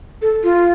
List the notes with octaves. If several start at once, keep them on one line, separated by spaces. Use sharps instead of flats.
A4
F4